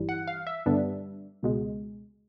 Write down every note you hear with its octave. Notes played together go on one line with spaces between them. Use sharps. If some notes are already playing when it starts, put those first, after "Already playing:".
Already playing: G1 G2 E3 G3
F#5
F5
E5
G2 D3 G3 B3 D4
C#2 B2 G#3